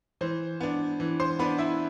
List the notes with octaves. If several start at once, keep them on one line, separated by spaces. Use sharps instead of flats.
E3 C5
B3 D4
E3
C5 C6
B3 D4 B4 B5
E4 E5